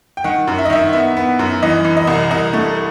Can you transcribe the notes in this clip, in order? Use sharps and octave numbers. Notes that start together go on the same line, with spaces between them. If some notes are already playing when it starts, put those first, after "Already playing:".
G5
D#3 F#5
F#2
E5
D#5
D#3 E5
B3 E5
B3
F#2
E3 D#5
E3
D#5
C2
C2 D#5
A3